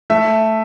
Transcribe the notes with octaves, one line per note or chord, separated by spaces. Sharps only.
A3 E5